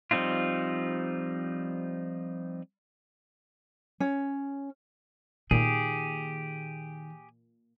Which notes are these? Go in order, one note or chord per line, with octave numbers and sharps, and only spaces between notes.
F3 G3 C4 D#4 F4
C#4
A#2 D#3 G4 G#4